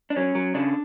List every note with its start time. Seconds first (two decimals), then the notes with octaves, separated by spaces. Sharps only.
0.10 D4
0.16 F#3 C#4
0.35 F#3
0.54 C#3 D4